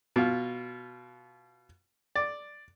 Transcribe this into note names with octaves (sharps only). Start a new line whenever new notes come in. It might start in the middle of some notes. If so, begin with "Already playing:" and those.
B2 F4
D5